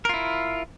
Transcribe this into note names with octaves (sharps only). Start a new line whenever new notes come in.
E4 F4 A#4